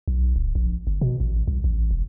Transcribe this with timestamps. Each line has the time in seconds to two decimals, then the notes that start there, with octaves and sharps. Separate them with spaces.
0.08 B1
0.36 D1
0.55 A#1
0.87 G1
1.01 B2
1.20 A1
1.48 C2
1.64 A1
1.91 E1